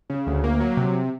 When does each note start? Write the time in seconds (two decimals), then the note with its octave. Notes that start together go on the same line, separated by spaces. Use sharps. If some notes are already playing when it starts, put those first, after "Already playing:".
0.10 C#3
0.27 D2
0.44 A#3
0.60 F#3
0.77 C3